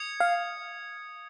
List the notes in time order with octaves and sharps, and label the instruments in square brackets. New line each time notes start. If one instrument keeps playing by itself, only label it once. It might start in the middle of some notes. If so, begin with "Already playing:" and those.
Already playing: [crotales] D#6 G#6 C#7
[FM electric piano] F5